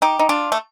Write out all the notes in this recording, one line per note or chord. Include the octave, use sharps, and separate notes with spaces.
D#4 G4
D#4
D4 F4
A3